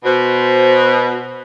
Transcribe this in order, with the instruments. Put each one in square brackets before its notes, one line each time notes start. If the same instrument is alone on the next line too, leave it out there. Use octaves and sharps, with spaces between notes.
[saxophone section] B2 [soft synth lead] C5